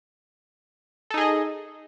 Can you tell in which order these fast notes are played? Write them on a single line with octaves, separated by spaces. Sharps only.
A4 D#4 G#4 D#5